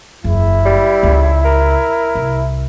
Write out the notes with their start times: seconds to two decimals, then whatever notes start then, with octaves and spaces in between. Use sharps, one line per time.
0.24 F#1 E2 E4
0.66 G3
1.03 C#2 C#3
1.45 A#4
2.15 C2